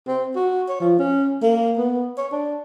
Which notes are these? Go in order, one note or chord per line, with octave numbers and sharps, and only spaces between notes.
C4
F#4
C#5
F3
C#4
A#3
B3
C#5
D4